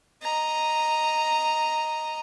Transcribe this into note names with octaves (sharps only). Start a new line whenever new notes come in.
D#5 A#5